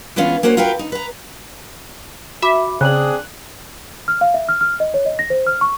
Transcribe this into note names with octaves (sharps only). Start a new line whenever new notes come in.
E3 G#3 B3 C#4 F4
A#3 C#4 F#4 C5 C#5
F4 F#4 A#4 B4 G5
D#4
B4 A#5
F#4 E5 B5 D6
C#3 C4 D4 G#4 F#6 F#7
F6
F5
E5
F6
F6
D#5
C#5
D#5
A#6
C5
F6
C#6